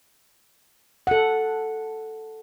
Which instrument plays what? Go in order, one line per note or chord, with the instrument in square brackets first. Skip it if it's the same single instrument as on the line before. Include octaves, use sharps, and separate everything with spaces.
[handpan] A4 F#5